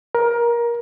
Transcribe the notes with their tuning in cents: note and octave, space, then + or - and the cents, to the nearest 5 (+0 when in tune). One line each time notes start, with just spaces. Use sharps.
A#4 +20